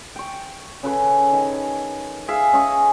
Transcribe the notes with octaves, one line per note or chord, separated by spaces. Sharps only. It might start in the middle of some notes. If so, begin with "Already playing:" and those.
G5 C#6
C#3 A4 B4 C#5
D#3 G#5
G#4 E5 F5
C#4 D#5 C#6